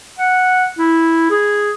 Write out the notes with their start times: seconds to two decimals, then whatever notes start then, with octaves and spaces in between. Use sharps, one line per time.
0.19 F#5
0.78 E4
1.30 G#4